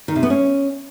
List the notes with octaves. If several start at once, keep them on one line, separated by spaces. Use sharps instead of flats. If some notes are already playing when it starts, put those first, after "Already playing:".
D#3
C3
B3
C#4